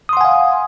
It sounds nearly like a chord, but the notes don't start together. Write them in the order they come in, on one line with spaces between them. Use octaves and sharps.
D#6 C6 F#5 G#5 F5